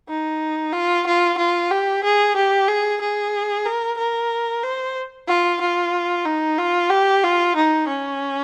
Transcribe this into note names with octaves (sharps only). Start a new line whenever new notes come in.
D#4
F4
F4
F4
G4
G#4
G4
G#4
G#4
A#4
A#4
C5
F4
F4
D#4
F4
G4
F4
D#4
C#4